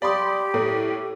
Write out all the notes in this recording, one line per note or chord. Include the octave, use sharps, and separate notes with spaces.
G4 D5 F5 B5 C6 D#6
A2 E4 A4 C#5